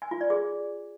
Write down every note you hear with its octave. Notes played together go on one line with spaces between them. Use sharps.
G#5
F4
D5
G#4